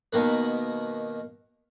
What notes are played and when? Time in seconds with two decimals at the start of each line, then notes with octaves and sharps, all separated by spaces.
0.13 B2 D#3 A#3 B4